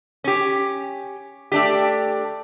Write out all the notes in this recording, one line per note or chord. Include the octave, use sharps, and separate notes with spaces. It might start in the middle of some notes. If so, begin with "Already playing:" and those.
C#4 G4
A3 D4 G4